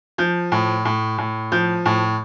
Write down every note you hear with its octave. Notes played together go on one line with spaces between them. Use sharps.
F3 G6
A2
A2
A2
F3 G6
A2